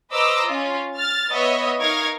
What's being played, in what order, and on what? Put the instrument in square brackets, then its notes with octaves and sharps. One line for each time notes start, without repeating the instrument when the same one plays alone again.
[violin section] B4 C5 D#5 A#5 D6 E6
C#4 F4
F6 A6
B3 C#5 D#5 E5
D#4 A#4 F5 C#6 G#6 A#6